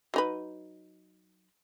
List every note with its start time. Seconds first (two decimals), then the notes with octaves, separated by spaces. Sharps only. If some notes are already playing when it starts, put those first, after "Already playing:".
0.14 F#3 D#4 B4